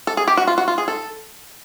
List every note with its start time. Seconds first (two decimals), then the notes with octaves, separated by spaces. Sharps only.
0.07 A4
0.17 G#4
0.28 G4
0.37 F#4
0.47 F4
0.58 F#4
0.68 F4
0.78 G#4
0.88 A4